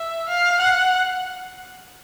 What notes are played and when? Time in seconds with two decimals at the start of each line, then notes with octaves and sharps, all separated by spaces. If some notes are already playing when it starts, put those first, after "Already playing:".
Already playing: E5
0.28 F5
0.60 F#5